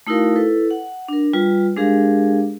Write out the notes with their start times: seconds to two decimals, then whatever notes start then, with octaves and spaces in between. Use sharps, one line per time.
0.07 A3 D#4 E4 F#4 A#4 F5
0.36 E4 A4 B4
0.71 F#5
1.08 D4 A#4
1.33 G3 F4 B4
1.76 G#3 D4 G4 G#4 A#4 F5